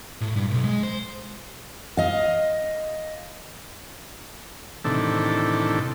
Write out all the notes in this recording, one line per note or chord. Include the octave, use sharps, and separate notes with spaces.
A2
G2
B1
G#3
C5
D#5 F5
A2 C3 D#3 E3 D4 A4